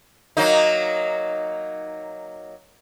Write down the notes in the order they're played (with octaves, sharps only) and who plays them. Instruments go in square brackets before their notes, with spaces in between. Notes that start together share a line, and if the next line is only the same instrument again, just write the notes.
[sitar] F#3 A#3 D#4